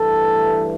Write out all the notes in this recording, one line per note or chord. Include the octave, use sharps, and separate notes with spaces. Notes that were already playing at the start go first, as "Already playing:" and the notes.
Already playing: G2 E3 A3 A4